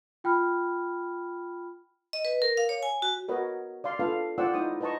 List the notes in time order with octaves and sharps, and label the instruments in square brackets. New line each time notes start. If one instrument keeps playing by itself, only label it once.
[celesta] F4 G5 B5 F6
[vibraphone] D#5
B4
A#4
F5
C#5
G#5
F#4
[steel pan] F#4 A#4 B4 C#5 D#5
D5 F5 C6
D4 F4 A4 B4 F5
F4 C5 D5 F#5 G5 E6
D#4 E4 C5 D#6
B4 C5 D#5 A5 A#5 C#6